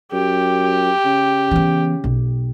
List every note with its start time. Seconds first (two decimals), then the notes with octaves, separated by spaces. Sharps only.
0.13 F#2 G4
1.05 C#3
1.51 E3 B3
2.04 B1